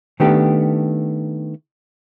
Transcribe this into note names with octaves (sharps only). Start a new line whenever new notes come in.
D#3 A3 B3 D4 G4